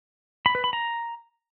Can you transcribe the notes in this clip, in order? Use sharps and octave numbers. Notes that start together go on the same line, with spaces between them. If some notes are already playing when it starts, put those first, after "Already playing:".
B5
B4
B5
A#5